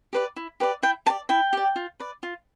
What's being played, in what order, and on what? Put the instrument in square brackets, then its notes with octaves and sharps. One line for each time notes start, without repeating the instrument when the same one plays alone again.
[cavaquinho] G4 B4 D5
E4
G4 B4 D5
E4 G5
G4 A5
D5
E4 G5
G4 D5
F4
B4 D5
F4